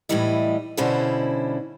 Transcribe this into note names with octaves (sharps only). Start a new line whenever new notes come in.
A2 E3 F3 G3 E4 D#5
B2 D3 G3 C#4 E4 C5